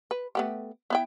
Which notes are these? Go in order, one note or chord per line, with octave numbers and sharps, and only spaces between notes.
B4
A3 B3 G4
B3 E4 G5